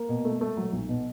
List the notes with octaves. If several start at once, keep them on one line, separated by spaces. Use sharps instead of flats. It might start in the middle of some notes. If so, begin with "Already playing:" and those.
Already playing: A#3
B2
A3
A3
F#3
B1
B2